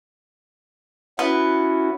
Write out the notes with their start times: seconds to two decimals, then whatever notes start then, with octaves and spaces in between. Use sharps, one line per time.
1.19 B3 C#4 E4 F#4